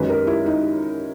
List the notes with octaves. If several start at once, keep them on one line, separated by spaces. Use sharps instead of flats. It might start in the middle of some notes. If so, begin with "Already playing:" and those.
Already playing: F#2 D#3 G#3 B4
A#4
E4
D#4